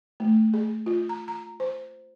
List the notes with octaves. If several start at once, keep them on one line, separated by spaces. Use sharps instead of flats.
A3
G#4
F4
A#5
A#5
C5